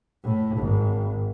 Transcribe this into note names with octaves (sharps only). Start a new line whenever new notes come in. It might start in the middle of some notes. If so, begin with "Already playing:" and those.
A2
G#1